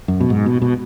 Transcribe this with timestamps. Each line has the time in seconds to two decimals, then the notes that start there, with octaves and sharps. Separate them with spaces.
0.08 F#2
0.21 B2
0.30 G#2
0.46 B2
0.62 B2